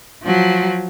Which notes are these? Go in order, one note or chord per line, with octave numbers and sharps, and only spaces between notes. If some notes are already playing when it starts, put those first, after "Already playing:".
F3 F#3